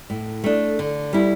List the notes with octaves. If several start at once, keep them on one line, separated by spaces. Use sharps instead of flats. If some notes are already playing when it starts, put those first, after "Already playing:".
A2
A3 D4
D3
G3 E4